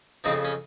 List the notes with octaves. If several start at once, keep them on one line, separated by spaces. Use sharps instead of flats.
F2 C#3 F3 C4 D#4
C#4